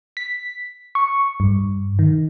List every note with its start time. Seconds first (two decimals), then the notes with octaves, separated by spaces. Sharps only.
0.17 B6
0.95 C#6
1.40 G2
1.99 D#3